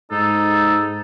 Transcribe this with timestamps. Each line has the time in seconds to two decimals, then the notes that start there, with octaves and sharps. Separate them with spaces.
0.11 G#2 D#4 A4